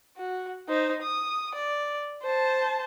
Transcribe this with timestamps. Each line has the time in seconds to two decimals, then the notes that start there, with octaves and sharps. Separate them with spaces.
0.17 F#4
0.68 D#4 C5
1.02 D#6
1.55 D5
2.23 C5 A5